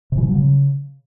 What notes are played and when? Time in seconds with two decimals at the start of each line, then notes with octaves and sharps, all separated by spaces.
0.12 C3
0.18 E3
0.23 F3
0.29 F#3
0.34 C#3